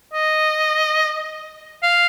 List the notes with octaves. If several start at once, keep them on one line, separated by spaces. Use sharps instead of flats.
D#5
F5